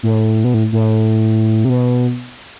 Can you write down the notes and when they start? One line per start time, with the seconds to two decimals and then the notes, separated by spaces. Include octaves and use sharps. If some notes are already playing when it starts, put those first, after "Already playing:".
0.03 A2
0.44 B2
0.54 A2
0.72 A2
1.65 C3
1.69 B2